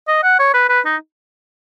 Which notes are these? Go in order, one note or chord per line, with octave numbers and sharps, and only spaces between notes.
D#5
F#5
C#5
B4
B4
D#4